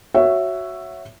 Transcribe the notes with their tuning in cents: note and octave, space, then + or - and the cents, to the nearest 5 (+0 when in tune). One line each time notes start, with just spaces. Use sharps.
F#4 +0 C#5 -10 E5 +10